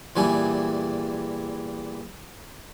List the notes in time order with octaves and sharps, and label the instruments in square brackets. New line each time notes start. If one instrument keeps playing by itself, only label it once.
[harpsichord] E2 A#2 E3 G3 G#5